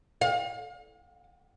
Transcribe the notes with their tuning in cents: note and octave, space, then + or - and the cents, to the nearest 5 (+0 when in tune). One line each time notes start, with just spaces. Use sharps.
F5 +30